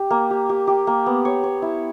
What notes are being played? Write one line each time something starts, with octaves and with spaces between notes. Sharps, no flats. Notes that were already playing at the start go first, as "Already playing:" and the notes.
Already playing: G4
A#3
G4
G4
G4
A#3
B3
C#5
C#5
E4